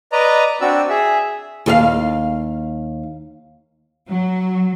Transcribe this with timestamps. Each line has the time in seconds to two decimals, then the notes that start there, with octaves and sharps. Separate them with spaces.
0.12 B4 D5 D#5 A#5
0.61 C4 D4 F#4 D5 E6
0.90 G#4 E5
1.66 D#2 G#4 F5
4.08 F#3